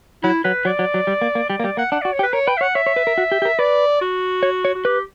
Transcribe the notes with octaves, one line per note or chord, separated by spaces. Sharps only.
F#3 E4
F#3 B4
F#3 D5
F#3
F#3
G3
A#3
A#3
G3 D5
A#3
G3 D5
A#3 F#5
D4 F#5
F#4 D5
C#5
G4
B4
A#4 C#5
B4 G5
E5
C#5 F#5
C#5 E5
C#5
B4
A#4
F#4
G4
G4
A#4
B4 D5
F#4
C#5
C#5
F#4
G4 B4